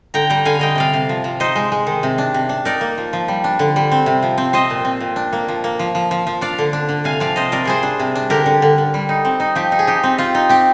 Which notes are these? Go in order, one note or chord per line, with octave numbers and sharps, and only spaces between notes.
D3 G5 A#5
G3 G5 A#5
D3 F5 G#5
D3 D#5 G5
C3 D5 F5
C3
F3
F3
D#4 C5 D#5
G#3
G#3
D#3
C3
D4
C3
D4
D#4 A#4 D5
A#3
F3
F3
G3
D4
D3
G3
C4
C3
F3
C4
C4 C5 D#5
A#2
C4
A#2
D4
A#3
F3
A#3
F3
F3
F3
F3
D4 D5 F5
D3
D4
D3
C3 F5 G#5
F3 D5 F5
C3 C5 D#5
C3 A#4 D5
G3 G#4 C5
D4
C3
D4
D3 G4 A#4
D3
D3
D3
G3
D#4
C4
D#4
F3 G4
D#4
G#4
D#4 G4
C4
C4 F4
D#4
C4 G4